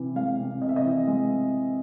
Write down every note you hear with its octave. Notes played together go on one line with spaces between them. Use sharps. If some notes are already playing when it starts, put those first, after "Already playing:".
Already playing: C3 E3
G#3 F5
C3
C3 D#5
E5
D#5
E3
G#3